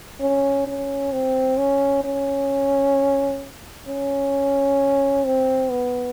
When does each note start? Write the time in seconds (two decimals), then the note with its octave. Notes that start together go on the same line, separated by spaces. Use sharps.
0.21 C#4
0.67 C#4
1.13 C4
1.59 C#4
2.04 C#4
3.88 C#4
5.25 C4
5.71 B3